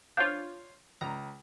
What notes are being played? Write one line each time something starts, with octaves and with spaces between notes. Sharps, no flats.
D4 F4 C5 C#5 F5 G6
C#2 A#5